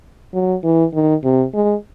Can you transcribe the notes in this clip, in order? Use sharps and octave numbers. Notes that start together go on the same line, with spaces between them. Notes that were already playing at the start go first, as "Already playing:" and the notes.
F#3
E3
D#3
C3
G#3